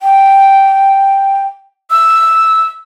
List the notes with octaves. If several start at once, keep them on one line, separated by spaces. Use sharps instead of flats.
G5
E6